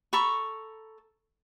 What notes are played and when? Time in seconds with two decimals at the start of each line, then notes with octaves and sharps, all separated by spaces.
0.13 A4 A#5 B5 C#6